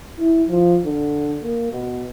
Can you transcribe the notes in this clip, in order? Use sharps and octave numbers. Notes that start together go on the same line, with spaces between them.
E4
F3
D3
A#3
B2